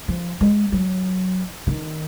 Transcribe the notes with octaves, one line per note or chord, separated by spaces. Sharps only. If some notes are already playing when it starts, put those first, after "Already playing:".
F3
G#3
F#3
D#3